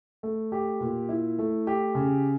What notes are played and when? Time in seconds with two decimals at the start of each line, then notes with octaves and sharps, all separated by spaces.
0.23 A3
0.52 G4
0.80 A#2
1.09 E4
1.39 A3
1.67 G4
1.95 C#3